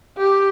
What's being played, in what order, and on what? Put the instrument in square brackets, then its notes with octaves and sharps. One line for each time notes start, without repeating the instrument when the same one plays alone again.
[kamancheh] G4